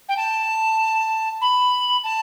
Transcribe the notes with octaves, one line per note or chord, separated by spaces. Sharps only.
G5
A5
B5
A5